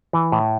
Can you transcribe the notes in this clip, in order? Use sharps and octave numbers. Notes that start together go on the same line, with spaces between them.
E3
A2